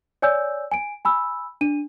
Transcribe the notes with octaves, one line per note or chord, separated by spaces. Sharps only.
C#5 D5 G#5 E6 G6
G#5 D7
G#5 B5 E6
D4 D#7